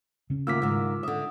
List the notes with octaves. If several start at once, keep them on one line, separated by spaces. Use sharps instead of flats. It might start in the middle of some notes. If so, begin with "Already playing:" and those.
C#3 C#4
D2 D#3 A#3 F4 D6 E6 F6 B6
G#2 D#3
D3 E5 D#6